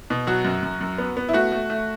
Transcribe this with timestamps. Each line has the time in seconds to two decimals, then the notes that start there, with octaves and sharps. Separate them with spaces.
0.10 B2
0.27 F#3 F#4
0.45 F#2
0.63 F#2
0.81 F#2
0.98 B3
1.17 B3
1.29 E4
1.33 A3 F#4
1.52 A3
1.70 A3